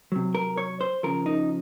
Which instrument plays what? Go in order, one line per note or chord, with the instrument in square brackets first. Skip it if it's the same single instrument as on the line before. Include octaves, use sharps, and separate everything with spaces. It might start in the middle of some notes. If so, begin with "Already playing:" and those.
[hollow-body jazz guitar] C3 F#3
A#4
C#5
C5
C#3 F3 A#4
D#4